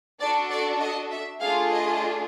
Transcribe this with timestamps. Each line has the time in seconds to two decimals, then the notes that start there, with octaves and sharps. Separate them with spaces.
0.20 D4 F#4 A4 D5
0.50 D5
0.80 D#5
1.11 E5
1.40 A3 D4 F4 G#4 F5
1.71 D#5